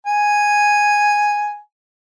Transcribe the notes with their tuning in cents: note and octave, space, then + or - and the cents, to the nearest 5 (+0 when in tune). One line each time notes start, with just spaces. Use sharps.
G#5 +0